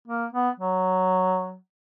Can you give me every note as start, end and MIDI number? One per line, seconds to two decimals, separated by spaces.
0.08 0.25 58
0.33 0.50 59
0.60 1.57 54